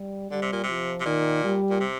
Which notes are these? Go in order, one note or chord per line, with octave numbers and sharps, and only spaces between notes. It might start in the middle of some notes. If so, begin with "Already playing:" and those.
Already playing: G3
D3 G3
C3
A#2
C3
F3
C3
A#2 D#3
G3
A#2
C3